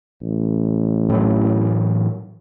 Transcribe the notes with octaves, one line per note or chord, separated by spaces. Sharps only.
A1
A2 E3 F#3